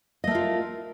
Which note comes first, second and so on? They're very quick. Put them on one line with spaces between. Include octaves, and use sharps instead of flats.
D#5 A3 A#4 F4